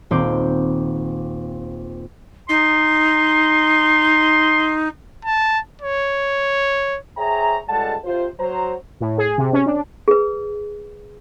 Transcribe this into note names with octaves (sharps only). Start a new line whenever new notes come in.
D#1 C4 C5 D6
D#4 C6
A5
C#5
G#4 C5 C#5 E5 G5 A#5
C#2 G3 G#3 A4 F#5 A5
C3 F4 C5
F#3 C5 A#5
A2
G#4
C3
C#4
D4
G#4 B4